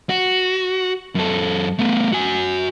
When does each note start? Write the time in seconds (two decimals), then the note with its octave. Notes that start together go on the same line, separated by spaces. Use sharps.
0.09 F#4
1.15 F#2 A4
1.79 A3 B3
2.12 F#4 G#5